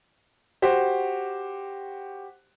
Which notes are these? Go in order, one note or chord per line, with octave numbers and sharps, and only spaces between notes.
F#4 G4 C5